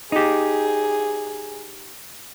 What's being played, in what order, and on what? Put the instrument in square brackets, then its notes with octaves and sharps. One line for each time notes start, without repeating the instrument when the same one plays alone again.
[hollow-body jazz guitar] D#4 G4 [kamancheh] G#4